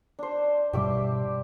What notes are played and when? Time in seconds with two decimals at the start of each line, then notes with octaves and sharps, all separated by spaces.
0.19 D4 C5
0.73 G2 B2 G3 G4 E5 D6